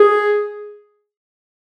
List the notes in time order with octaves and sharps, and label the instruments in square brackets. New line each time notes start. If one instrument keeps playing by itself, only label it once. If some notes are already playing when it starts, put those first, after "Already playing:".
Already playing: [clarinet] G#4